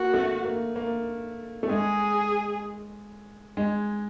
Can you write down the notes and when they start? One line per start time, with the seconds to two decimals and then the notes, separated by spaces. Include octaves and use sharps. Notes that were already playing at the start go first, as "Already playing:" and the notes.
Already playing: A#3 F#4
0.14 A3
0.45 A#3
0.76 A#3
1.63 A3
1.69 G#3 G#4
3.57 G#3